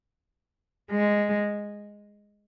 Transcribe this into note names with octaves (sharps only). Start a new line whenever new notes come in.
G#3